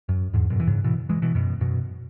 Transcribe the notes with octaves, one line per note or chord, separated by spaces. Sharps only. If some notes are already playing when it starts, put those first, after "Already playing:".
F#2
E2 G#2
F#2 B2
E3
G#2 C#3
B2 E3
E3 G#3
B2 E3
F#2 B2
F#2 B2